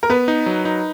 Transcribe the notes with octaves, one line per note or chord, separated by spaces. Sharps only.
A#4
B3 B4
D#4
F#3
D#4